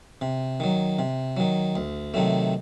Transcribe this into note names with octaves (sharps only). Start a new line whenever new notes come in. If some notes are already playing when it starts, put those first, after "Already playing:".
C3
D#3 F#3
C3
D#3 F#3
D2
C3 D#3 F#3 A3